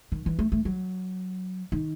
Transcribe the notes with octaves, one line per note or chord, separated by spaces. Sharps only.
D#3
E3
A3
A3
F#3
D#3